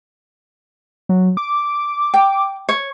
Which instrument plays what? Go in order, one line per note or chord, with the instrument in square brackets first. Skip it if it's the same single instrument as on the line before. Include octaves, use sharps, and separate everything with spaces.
[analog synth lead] F#3
D6
[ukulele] G5
C#5